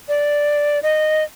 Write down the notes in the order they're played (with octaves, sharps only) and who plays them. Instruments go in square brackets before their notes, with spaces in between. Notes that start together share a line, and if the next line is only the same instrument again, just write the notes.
[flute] D5
D#5